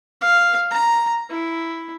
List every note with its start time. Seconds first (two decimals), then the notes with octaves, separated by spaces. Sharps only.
0.21 F5
0.71 A#5
1.30 E4